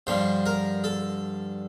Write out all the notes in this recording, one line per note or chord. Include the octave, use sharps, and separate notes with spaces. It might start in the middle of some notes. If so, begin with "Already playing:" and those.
G2 D3 F3 C5
A#4
A4